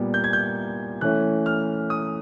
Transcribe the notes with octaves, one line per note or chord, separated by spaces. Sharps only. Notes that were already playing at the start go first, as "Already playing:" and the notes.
Already playing: A#2 G3 B3
G6
G#6
G6
E3 A3 C#4 F#6
F6
D#6